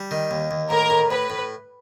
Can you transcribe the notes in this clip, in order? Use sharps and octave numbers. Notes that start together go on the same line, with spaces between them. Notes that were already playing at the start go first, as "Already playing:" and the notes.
Already playing: G3
D#3
D#2
D#2
A2 A#4
A2
A2 B4
A2